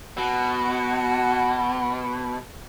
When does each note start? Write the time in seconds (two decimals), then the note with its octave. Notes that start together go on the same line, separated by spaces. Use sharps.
0.18 B2 F#4